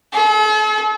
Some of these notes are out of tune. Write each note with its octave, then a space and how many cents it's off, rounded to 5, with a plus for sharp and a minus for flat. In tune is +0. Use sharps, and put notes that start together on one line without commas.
A4 -45